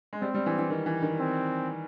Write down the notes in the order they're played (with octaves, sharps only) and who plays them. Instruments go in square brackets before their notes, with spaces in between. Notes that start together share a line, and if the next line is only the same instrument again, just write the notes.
[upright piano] G#3
[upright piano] G3 [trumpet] C4
[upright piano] G3
E3
E3
D#3
E3
D#3
[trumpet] C4